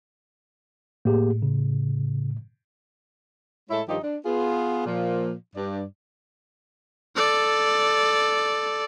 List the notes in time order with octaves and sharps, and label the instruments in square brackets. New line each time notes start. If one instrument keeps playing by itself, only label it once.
[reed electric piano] A2 [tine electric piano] A#3 G4 G#4
[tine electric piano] C#3
[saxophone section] A2 G#3 E4 A4 C#5 E5
G2 D#3 F3 D#4 G4
D4
B3 F4 G#4
A#2 F3
G2 D5
[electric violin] A4 D5